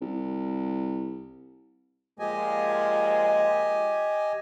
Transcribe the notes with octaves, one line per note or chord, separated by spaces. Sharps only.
C2
A#2 F3 G#3 G4 D#5 G#5